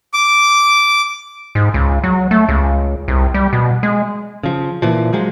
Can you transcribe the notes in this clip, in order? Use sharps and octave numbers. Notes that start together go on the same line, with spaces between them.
D6
G#2
C#2
F#3
A3
C#2
C2
G3
B2
G#3
C#3 F3
A#2 E3 F3
F3 F#3 G#3